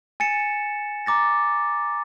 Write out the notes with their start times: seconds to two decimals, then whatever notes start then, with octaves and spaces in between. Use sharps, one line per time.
0.20 G#5 A6 C#7 E7
1.06 A#5 D6 A6 A#6